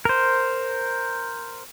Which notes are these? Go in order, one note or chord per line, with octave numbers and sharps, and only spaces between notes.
A#4 C5